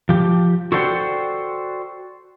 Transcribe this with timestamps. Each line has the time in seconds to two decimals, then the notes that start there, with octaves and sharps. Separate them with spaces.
0.09 F3 G4
0.72 F#4 A4 C5 D5 F#5 G5